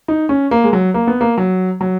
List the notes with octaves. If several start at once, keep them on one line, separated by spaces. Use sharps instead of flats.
D#4
C#4
A#3
G#3
F#3
A#3
B3
A#3
F#3
F#3